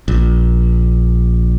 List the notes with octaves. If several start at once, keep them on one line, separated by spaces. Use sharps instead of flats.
A#1